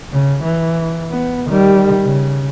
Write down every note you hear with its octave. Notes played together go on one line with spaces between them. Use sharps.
C#3
E3
B3
D#3 G3
C#3